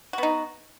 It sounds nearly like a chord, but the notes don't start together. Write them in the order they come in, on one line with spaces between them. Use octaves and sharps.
F#4 B3 D#4